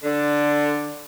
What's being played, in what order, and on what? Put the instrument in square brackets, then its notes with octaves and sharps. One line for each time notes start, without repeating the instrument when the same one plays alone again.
[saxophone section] D3 D4